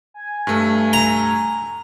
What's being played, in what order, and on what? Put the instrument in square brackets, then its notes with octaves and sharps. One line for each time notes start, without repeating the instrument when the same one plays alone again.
[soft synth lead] G#5
[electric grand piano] G2 A3
[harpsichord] A#5